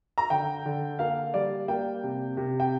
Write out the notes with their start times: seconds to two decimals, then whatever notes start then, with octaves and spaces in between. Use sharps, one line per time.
0.18 A#5
0.30 D3 G5
0.65 D3
0.99 A#3 F5
1.34 G3 D5
1.68 A#3 G5
2.03 C3
2.37 C3
2.60 G5